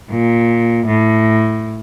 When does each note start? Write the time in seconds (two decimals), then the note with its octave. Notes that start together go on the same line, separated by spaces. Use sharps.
0.11 A#2
0.86 A2